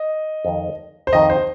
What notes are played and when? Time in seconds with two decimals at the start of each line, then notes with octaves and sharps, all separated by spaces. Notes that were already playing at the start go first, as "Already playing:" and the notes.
Already playing: D#5
0.45 F2 D#3 C4
1.07 C5
1.13 F2 D#3 C4 D#5
1.30 C5